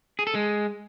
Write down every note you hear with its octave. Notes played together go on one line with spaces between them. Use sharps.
G#4
A4
G#3